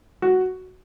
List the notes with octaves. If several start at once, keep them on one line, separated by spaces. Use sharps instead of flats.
F#4